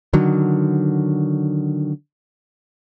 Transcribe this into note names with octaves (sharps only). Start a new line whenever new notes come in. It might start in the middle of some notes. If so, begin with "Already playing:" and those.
D3 D#3 F#3